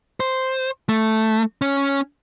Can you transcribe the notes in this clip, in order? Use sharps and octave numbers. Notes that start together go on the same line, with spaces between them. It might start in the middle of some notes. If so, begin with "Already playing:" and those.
C5
A3
C#4